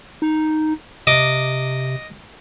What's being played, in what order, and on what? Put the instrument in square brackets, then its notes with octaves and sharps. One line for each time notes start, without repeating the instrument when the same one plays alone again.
[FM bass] D#4
[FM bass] C3 [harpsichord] D#5 D6